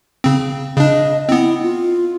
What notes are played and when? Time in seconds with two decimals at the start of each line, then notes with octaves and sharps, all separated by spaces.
0.24 C#3 C4
0.78 C#3 D4 D#5
1.29 B3 C4 E4
1.63 F4